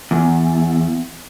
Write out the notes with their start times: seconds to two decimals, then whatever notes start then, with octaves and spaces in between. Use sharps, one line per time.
0.11 E2